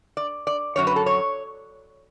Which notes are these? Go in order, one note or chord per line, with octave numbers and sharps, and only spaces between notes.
D5
D5
F#2 D3 F#3 C#5
B4
A4
C#5